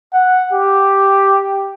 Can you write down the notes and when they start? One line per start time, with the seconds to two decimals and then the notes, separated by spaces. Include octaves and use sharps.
0.13 F#5
0.53 G4